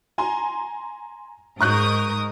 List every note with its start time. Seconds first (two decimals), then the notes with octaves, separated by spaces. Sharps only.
0.18 G#5 A#5 C6
1.61 G#2 A#4 C#6 D#6 F#6 G6